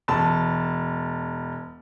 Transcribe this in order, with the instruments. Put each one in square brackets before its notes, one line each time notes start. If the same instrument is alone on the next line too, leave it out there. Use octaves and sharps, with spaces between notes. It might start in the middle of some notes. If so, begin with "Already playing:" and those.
[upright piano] E1 A5